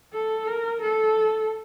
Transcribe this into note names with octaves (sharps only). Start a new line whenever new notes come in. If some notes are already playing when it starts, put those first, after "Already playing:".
A4
A#4
A4